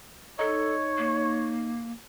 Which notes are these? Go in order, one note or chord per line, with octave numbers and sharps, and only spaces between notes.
D#4 A4 C#5
A#3